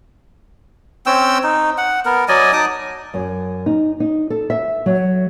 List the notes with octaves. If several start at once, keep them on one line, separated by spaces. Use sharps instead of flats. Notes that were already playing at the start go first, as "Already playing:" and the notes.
C4 C#4 G5 E6
D#4
F#5
B3 A#4
F#3 D5 D#5 G#5
D#4 A5 D6 D#6
F#2
D#4
D#4
A4
E5
F#3